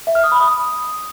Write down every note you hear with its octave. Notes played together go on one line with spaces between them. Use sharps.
E5
F6
D#6
B5
D#6